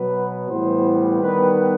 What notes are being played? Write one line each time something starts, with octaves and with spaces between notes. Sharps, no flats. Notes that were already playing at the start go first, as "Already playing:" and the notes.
Already playing: B2 F#3 B3 B4
A2 E3 G3 B3 C5
D#3 G3 B3 B4